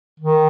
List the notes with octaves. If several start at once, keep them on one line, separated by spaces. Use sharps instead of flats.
D#3